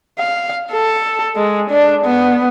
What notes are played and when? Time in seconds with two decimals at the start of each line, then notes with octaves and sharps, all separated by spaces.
0.19 F5
0.72 A4
1.36 G#3
1.70 D4
2.05 B3